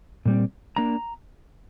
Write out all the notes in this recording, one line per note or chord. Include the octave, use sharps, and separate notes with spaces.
A#2 G3 C4
A#3 D4 A#5